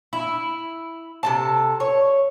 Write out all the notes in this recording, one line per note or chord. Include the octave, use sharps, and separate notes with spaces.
E4
C3 A4 A5
C#5